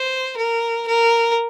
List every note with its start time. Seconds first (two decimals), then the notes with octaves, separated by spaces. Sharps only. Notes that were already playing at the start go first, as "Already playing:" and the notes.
Already playing: C5
0.37 A#4
0.87 A#4